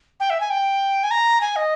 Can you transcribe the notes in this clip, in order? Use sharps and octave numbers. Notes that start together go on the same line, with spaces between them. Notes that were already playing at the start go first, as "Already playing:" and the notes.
G5
E5
G#5
G5
G#5
A#5
G#5
D#5